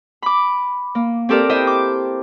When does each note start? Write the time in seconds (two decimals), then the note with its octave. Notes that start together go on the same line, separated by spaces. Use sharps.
0.22 B5 D6
0.95 A#3
1.29 C4 G4 A4 A#4 D5
1.49 E4 C5 D#5 E5 G5
1.67 D6